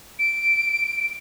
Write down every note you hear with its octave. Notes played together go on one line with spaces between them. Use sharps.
D7